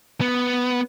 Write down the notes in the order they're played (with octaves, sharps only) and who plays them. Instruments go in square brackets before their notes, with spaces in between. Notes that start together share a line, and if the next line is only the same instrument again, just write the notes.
[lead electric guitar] B3